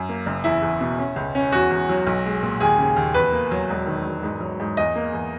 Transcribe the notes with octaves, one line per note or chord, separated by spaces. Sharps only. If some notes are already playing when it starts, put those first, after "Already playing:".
Already playing: F#2
A#3
F#1
E2 E4
E2
B2
C#4
C#2
C#4
E2 F#4
E2
F#3
B1
G#3
A#2
D#2 G#4
C#3
D#2
E2 B4
A#3
F#3
E1
D#3
E1
G#2
F#3
G#2
E2 D#5
A#3
E2